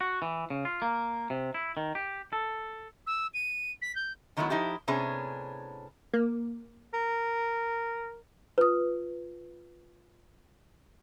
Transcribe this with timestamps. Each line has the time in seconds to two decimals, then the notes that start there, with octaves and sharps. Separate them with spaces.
0.01 F#4
0.22 E3
0.50 C#3
0.65 F4
0.82 A#3
1.30 C3
1.54 E4
1.77 D#3
1.95 G4
2.33 A4
3.06 E6
3.34 D#7
3.81 B6
3.95 G6
4.37 D3 D#3 F#3 A3 B3 E4
4.50 F3 D#4 E4 G4
4.88 A2 C3 B3 C#4 D4 G#4
6.13 A#3
6.93 A#4
8.58 F4 B4 D#6